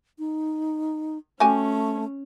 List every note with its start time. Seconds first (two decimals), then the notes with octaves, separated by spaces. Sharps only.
0.19 D#4
1.40 A3 C#4 F#4 G4 G#5